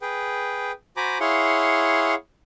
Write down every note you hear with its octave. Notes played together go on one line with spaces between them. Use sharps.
G#4 B4 G5
F#4 C5 G#5 A#5 B5 D6
E4 G#4 C#5 F5 F#5 C6